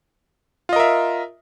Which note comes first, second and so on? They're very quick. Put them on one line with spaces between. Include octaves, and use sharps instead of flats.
F4 D#5 A#4 E5